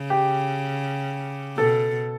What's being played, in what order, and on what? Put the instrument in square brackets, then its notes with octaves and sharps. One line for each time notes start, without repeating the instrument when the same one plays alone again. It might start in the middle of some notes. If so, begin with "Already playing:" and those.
Already playing: [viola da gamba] C#3
[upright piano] G4
[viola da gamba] B2 [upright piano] A4